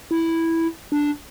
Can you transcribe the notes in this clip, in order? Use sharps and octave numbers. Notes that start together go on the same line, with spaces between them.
E4
D4